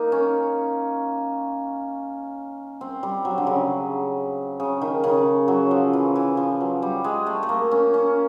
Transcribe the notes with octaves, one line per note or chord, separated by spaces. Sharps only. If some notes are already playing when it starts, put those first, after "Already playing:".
Already playing: A#3 D#4
C#4
C4
G3
F#3
D3
C#3
C#3
D#3
C#3
F#3
F3
E3
E3
F3
F#3
G3
G#3
A3
A3
A#3
C#4
C#4